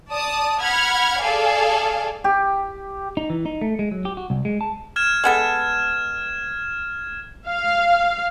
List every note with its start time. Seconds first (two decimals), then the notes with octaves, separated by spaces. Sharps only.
0.11 D5 A5 D#6
0.60 F#5 B5 F6 G#6
1.21 G#4 A4 D5 F5 G#5
2.24 G4
3.17 D#4
3.30 E3
3.46 D#4
3.61 A3
3.79 G#3
3.91 F#3
4.05 G4
4.17 F#4
4.30 C2
4.45 G#3
4.61 A5
4.96 F6 G#6 E7
5.24 G#3 B3 A4
7.46 F5